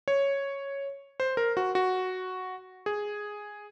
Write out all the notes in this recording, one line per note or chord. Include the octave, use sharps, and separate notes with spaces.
C#5
C5
A#4
F#4
F#4
G#4